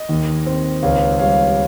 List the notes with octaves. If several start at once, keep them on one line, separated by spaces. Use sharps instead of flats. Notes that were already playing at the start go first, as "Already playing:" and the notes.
Already playing: D#5
D#2
C4
C#2 C#5 F5
G3 C#5 F5